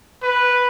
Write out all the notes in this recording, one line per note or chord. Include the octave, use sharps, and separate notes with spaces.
B4